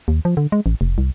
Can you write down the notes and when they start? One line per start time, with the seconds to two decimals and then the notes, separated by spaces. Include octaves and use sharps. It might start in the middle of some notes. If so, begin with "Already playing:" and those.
0.08 D#2
0.25 F3
0.37 D3
0.52 G#3
0.66 A1
0.81 F1
0.98 C2